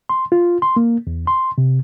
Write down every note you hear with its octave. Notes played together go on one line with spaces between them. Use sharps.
C6
F4
C6
A#3
E2
C6
C3